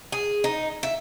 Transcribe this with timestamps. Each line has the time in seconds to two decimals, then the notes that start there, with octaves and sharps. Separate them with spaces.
0.12 G#4
0.44 D#4
0.83 E5